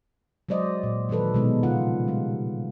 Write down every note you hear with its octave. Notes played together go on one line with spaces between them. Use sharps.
F#3 G#3 C5 D5 D#5
A#2
D#3 E3 F#3 A4 B4
B2 G#3 D#4
C#3 F3 F4 F#5
G3 G#3